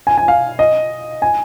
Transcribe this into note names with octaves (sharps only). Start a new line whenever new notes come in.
G#5
G#5
F5
D#5
G#5